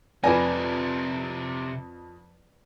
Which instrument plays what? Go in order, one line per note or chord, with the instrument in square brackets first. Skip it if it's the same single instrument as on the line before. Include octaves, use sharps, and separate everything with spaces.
[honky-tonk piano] F2 A#6 [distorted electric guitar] C3 A#4 [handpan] B4 D5 [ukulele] G#5